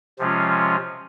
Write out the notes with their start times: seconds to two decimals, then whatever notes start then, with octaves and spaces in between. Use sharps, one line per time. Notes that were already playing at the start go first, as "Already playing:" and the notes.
0.19 C3 F3 G#3 C#4 F4